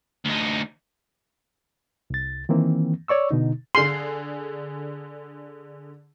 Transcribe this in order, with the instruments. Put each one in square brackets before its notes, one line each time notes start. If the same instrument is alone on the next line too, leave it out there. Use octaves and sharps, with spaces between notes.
[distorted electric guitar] D2 D#4
[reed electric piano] C2 A6
D#3 E3 A#3 C4
C#5 D5 C#6 E6
B2 D3 D#4
[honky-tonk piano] D3 G#4 [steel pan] C6